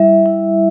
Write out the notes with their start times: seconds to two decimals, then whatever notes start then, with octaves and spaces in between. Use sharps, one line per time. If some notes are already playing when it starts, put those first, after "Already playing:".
Already playing: G3 E4 E5
0.26 E4